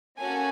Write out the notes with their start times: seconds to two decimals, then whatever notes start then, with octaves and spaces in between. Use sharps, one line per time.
0.18 A#3 C#4 F#4 A4 G#5